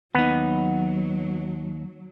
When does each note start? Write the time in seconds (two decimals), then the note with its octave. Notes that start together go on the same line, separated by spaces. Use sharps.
0.15 D#2 F#3 B3 D#4